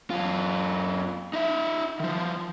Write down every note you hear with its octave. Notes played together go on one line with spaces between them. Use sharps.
F#2 F4
D#4 E5
D#3 F3